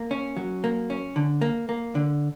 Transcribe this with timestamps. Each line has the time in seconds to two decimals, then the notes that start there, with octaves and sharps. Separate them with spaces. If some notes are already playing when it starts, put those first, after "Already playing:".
Already playing: A#3
0.11 C#4
0.36 F#3
0.64 A#3
0.90 C#4
1.16 D3
1.41 A#3
1.69 A#3
1.95 D3